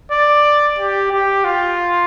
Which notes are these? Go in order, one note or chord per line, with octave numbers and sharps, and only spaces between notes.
D5
G4
G4
F4